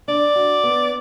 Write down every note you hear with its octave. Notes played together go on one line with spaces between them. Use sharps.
D4 D5
F#4
B3